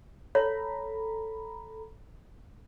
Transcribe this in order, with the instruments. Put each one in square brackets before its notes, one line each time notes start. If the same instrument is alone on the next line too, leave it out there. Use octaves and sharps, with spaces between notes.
[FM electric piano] A4 A#5 B5 [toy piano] C#5